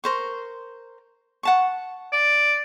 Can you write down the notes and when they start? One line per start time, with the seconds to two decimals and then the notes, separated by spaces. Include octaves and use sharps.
0.04 A#4 C5 C#6
1.43 F#5 A5 C#6
2.12 D5